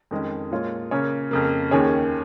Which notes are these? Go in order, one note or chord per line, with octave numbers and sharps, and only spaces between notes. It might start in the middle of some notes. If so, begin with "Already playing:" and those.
F2 D#3 G#3 C#4
A#2 G#3 F4 C#5
C#3 A#3 C#4 G#4 C#5
F2 C#3 A#3
D#2 D#3 C#4 G#4 C#5